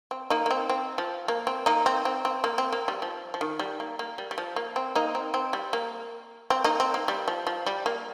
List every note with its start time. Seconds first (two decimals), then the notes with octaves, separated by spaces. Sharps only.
0.11 C4
0.30 A#3 D#4
0.46 A#3
0.51 C4
0.69 C4
0.98 F3
1.28 A#3
1.47 C4
1.66 A#3 D#4
1.86 C4
2.05 C4
2.25 C4
2.44 A#3
2.58 C4
2.72 A#3
2.88 G3
3.02 F3
3.34 F3
3.41 D#3
3.59 G3
3.80 A#3
3.99 A#3
4.18 G3
4.31 G3
4.38 F3
4.56 A#3
4.76 C4
4.95 A#3 D#4
5.15 C4
5.34 C4
5.53 G3
5.73 A#3
6.50 C4
6.64 A#3 D#4
6.80 C4
6.94 A#3
7.08 G3
7.28 F3
7.47 F3
7.66 G3
7.86 A#3